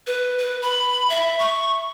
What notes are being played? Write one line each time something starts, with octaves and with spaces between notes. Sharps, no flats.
B4
B4
B5
E5
C#6